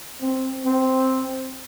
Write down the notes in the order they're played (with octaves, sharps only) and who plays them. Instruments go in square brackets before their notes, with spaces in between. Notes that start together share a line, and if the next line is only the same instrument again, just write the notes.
[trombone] C4
C4